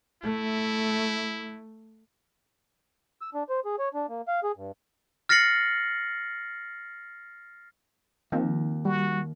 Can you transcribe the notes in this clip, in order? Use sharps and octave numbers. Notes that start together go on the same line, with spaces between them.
A3 E4
E6
D4
C5
G#4
C#5
D4
A#3
F5
G#4
G2
F6 A6 A#6 C7 C#7 F#7
D#2 D#3 F3 C4
G3 F#4